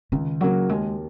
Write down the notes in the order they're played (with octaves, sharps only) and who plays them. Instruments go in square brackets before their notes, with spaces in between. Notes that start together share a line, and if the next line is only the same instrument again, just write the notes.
[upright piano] C#2 [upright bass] D#3
[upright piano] C#3 A#3 F#4 [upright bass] F#3
[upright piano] D#2 [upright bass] G#3